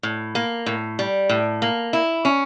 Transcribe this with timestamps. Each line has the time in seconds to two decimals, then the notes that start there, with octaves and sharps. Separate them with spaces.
0.03 A2
0.35 A#3
0.66 A2
0.99 G3
1.29 A2
1.62 A#3
1.93 E4
2.25 C#4